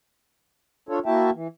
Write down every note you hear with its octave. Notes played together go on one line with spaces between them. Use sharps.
D4 F4 A4 C#5
A#3 E4 F#4 E5 G5 A5
E3